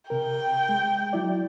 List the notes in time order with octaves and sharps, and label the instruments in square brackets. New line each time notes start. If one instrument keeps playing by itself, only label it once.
[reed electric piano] C3 A#4 [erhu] G5
[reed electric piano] G#3
F#3 E4 D5